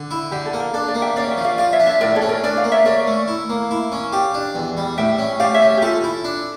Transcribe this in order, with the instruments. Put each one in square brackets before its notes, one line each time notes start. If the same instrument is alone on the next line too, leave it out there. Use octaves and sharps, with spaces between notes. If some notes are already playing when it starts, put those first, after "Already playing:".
Already playing: [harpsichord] D3
E4
[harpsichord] D3 [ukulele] G4
[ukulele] A4
[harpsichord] A#3
[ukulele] A#4
[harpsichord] D4 [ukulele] A4
[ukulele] D5 F5
[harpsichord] A#3
[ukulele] E5 G5
[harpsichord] C#4 [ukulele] D5 F5
[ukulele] E5 G5
[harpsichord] F3
[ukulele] D5 F5
[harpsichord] F4 [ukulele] D5 F5
[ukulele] C#5 E5
[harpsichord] D4
[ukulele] C#5 E5
[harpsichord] A2 [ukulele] A#4 D5
[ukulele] A4 C#5
[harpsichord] C#4
[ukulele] A#4
[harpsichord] D4 [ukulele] A#4 D5
[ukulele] D5 F5
[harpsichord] A#3
[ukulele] C#5 E5
[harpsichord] C#4 [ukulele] A#4 D5
[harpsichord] A3
E4
A#3
E4
C#4
[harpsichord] G4 [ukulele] D5 F5
[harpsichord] D4
E2
G3
[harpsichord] A2 [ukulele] E5 G5
[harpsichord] C#4
[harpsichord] G4 [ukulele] D5 F5
[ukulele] C#5 E5
[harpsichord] C#4
[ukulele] G4
[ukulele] F4 [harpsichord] A4
[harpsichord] E4
D4